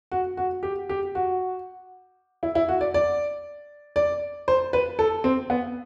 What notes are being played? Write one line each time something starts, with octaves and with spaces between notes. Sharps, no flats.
F#4
F#4
G4
G4
F#4
E4
E4
F#4
D5
D5
D5
C5
B4
A4
C4
B3